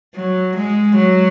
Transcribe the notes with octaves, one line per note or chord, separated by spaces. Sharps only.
F#3
G#3
F#3